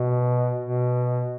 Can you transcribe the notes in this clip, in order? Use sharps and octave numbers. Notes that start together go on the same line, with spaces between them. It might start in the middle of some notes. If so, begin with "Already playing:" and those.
Already playing: B2
B2